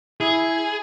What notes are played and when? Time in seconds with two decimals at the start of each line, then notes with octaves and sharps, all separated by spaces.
0.21 E4 G#4